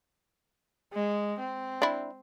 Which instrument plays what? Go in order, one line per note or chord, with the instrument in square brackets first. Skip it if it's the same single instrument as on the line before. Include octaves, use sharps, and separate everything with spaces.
[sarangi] G#3
C4
[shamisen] D4 E4